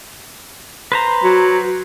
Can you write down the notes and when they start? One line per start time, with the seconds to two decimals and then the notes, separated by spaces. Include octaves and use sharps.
0.92 B4 C5 A#5
1.24 F#3